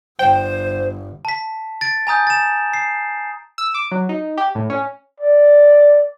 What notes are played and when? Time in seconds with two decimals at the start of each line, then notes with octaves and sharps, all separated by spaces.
0.19 G1 C5 G5
1.25 A5 B6
1.81 A6 D7
2.07 G#5 A#5 D#6 G6
2.27 A6 E7
2.73 C7
3.58 E6
3.74 D6
3.91 F#3
4.09 D#4
4.38 G4
4.55 A2
4.70 C#4
5.20 D5